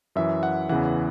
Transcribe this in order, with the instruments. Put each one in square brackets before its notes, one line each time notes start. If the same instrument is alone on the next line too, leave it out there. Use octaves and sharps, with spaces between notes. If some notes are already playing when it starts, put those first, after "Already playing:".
[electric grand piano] F#2 E3 E5
F#5
E2 C#3 E3 F#5